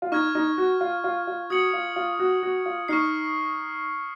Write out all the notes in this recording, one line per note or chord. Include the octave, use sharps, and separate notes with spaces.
F4
D#4 C#6 F6 G#6
D#4
F#4
F4
F4
F4
F#4 D#6 G#6 C#7 F#7
F4
F4
F#4
F#4
F4
D#4 C#6 F6 C7